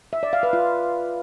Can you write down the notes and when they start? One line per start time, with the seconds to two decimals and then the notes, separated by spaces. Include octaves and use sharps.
0.13 E5
0.23 D5
0.33 F5
0.43 B4
0.53 F4